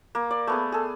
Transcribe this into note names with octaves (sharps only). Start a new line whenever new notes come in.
A#3
D5
A3 B3 G#4
G#4 A4